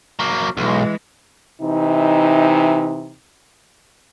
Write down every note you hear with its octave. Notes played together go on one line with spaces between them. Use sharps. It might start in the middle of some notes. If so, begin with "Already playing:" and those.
F#3 A#3
B1 E3 G#3
C3 E3 D#4